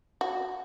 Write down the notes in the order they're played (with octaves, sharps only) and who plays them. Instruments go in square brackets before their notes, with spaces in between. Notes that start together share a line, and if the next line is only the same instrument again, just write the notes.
[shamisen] F#4